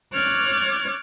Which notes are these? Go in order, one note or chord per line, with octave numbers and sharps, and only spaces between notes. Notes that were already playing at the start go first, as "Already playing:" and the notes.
C#5 D6 F6 F#6 G#6 A6